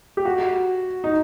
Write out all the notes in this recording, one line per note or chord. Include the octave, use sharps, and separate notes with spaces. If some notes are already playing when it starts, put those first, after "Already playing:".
G4
F#4
D#4